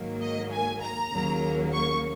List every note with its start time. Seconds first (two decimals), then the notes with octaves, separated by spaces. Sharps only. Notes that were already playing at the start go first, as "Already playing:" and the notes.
Already playing: G#2 D#3 F#3 A#3
0.20 D#5
0.51 G#5
0.82 A#5
1.12 D#2 C#3 F#3 A#3
1.72 C#6